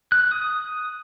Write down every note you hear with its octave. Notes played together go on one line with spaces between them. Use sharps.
F#6
D#6